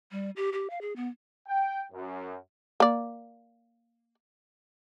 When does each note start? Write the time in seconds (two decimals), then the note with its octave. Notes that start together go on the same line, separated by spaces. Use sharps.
0.12 G3
0.36 G4
0.53 G4
0.70 F5
0.81 G#4
0.96 B3
1.48 G5
1.92 F#2
2.80 A#3 D5